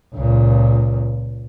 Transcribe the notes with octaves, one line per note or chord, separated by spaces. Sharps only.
C#2 A#2